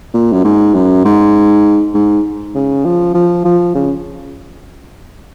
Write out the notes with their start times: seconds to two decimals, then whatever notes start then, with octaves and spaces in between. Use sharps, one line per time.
0.14 A#2
0.32 F#2
0.44 G#2
0.74 F#2
1.05 G#2
1.94 G#2
2.55 C#3
2.85 F3
3.15 F3
3.45 F3
3.75 C#3